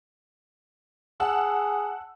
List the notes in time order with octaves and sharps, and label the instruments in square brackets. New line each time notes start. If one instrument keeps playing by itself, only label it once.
[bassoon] G#4 [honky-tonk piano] F#5 A5 E6